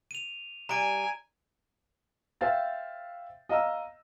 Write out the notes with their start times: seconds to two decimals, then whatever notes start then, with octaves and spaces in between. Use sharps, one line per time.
0.11 D#7 F7
0.69 G3 G#5 A#5 D7
2.41 C5 E5 F5 G5 A6
3.49 D#5 F5 A#5 E6